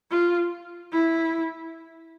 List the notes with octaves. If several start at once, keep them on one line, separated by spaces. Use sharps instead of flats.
F4
E4